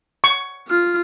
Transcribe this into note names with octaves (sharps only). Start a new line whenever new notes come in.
C#6
F4 F6